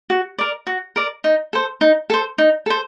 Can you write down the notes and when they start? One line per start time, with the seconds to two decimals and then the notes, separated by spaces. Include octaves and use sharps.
0.10 F#4
0.38 A#4 D5
0.67 F#4
0.96 A#4 D5
1.24 D#4
1.53 A4 C5
1.81 D#4
2.10 A4 C5
2.38 D#4
2.66 A4 C5